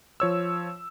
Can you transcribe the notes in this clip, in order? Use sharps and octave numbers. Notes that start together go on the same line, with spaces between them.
F3 C#5 E6